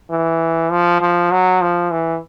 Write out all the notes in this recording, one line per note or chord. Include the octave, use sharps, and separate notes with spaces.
E3
F3
F3
F#3
F3
E3